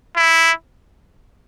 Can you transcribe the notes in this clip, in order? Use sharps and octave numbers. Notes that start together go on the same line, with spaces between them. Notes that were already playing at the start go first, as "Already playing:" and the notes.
E4